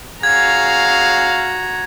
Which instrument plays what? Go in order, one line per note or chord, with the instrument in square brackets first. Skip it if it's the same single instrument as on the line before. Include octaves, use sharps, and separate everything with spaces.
[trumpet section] C#4 G#4 F5 [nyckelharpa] F#4 A#5 [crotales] G#6